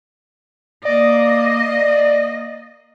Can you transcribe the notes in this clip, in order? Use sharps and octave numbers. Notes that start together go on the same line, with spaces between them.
A#3 D5 D#5